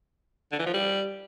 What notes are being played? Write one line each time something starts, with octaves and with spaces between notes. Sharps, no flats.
D3
E3
F3
G3